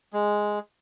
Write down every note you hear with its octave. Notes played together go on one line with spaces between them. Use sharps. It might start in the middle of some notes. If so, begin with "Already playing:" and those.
G#3